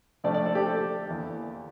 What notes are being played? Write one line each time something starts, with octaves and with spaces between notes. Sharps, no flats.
C3 F3 A3 C4 D5
D5
A4
G4
A4
E2 E3 A#3